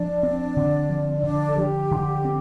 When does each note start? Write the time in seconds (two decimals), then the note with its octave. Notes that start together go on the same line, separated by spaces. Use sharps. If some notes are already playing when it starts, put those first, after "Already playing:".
Already playing: F3 D4 D5
0.23 C4
0.57 D3
0.90 F3
1.23 D3 D4 D5
1.48 A4
1.57 F3 G4
1.91 D3
2.25 C4